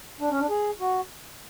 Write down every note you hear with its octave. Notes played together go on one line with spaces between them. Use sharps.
D4
C#4
D4
G#4
F#4